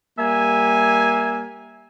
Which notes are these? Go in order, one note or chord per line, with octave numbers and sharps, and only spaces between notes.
G3 A#3 E5 G#5